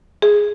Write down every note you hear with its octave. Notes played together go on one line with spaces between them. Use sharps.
G#4